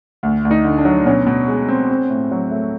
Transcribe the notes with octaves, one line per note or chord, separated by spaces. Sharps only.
D2
D2
D#4
D3
D4
F#3
B2 C#4
B2
G#3
C4
C4
A2
F#3
A3